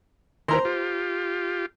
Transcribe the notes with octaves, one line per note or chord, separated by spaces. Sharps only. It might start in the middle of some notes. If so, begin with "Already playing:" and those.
D#3 E4 A#4 C5 A#5 C6
F4 G4